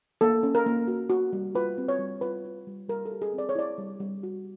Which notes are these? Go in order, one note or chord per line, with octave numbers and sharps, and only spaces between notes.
A#3 A4
C#4
A#4
A#3
F#4
F#4
G3
F4 B4
C4
C#5
G3
F4 B4
F4
G3
G3 A#4
A4
G4
G#4
C4 D5
C#5
E4 D5
G3
G3
F#4